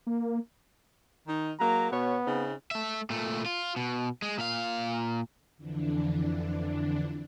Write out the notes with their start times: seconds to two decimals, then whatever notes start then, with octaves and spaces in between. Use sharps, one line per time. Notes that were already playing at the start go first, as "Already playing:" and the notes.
0.07 A#3
1.26 D#3 D#4
1.59 F#3 G#3 A#3 A#5
1.91 B2 B3 C#5
2.25 C#3 C4 D#4
2.71 A3 E5
3.10 A#2 A3
3.46 F4
3.76 B2
4.22 G#3
4.38 A#2 F5
5.57 F2 D3 E3 D4